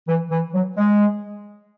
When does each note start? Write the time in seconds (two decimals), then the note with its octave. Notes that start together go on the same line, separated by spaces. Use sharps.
0.08 E3
0.31 E3
0.54 F#3
0.77 G#3